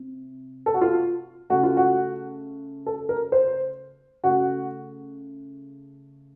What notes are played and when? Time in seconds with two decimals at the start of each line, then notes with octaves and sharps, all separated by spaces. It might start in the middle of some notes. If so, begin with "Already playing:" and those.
Already playing: C3
0.66 A4
0.74 F#4
0.81 F4
1.50 C#3 A3 F#4
1.63 F4
1.77 F#4
2.86 A4
3.09 A#4
3.32 C5
4.24 C#3 A3 F#4